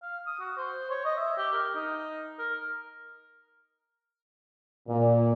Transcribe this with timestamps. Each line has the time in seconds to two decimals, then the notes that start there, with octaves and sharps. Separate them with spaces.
0.02 F5
0.27 D#6
0.40 F#4
0.57 C5
0.90 C#5
1.05 D#5
1.17 E5
1.38 G4
1.53 A#4
1.75 D#4
2.39 A#4
4.87 A#2